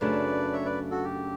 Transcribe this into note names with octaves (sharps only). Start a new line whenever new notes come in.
F#2 C#3 F#3 A3 D4 B4 D5
C#5 E5
B4 D5
F#4 A4
G4